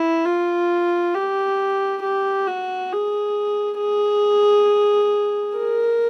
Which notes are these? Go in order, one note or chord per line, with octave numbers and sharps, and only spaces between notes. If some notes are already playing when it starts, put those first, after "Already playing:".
Already playing: E4
F4
G4
G4
F#4
G#4
G#4
A#4